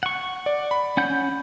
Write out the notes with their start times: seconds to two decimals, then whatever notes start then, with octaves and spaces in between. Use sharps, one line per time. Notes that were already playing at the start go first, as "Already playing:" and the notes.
0.03 F#5 C#6
0.46 D5
0.71 B5
0.97 C#4 F#5 G6